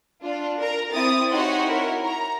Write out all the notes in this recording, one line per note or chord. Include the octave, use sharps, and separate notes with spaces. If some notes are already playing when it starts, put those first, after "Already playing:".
D4 F4
A#4 A#5
C4 E4 D#6 A6
D#4 F#4 G4 C#5 F#5 C6
E4 A#4 C#5
A#5